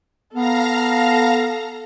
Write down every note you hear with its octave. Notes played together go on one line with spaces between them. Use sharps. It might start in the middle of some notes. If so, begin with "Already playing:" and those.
B3 A4 F5 A#5 A#6